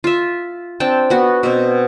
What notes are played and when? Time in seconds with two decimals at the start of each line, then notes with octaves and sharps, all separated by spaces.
0.04 F4 E5
0.80 C4 D4 G5 A5
1.10 B3 F#4
1.43 B2 C4